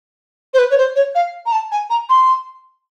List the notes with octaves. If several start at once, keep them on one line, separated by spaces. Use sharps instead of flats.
C5
B4
C#5
C5
C#5
F5
A#5
A5
G#5
A#5
C6